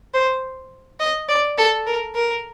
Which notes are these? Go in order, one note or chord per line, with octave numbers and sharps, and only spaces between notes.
C5
D#5
D5
A4
A#4
A#4